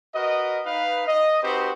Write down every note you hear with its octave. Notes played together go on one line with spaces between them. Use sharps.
F#4 A#4 B4 D#5
D#4 B4 F5
D#5
C4 D#4 F#4 G4 B4 C5